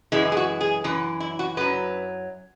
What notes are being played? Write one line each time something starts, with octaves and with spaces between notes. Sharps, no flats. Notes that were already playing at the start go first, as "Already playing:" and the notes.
F#2 E3 G#3 E4
G#4
F#4
G#4
F#2 E3 B4
E4
F#4
F#2 F#3 B4